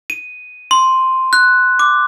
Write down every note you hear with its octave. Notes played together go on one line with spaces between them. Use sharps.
D#7
C6
F#6
D6